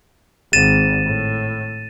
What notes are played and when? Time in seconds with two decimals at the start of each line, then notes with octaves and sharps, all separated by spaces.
0.53 G#1 A6 D#7 E7
1.05 A2